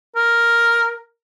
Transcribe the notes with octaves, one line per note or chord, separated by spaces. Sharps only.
A#4